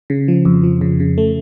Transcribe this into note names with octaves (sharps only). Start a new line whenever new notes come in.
C#3
F3
F2
F3
C#3
C#3
A3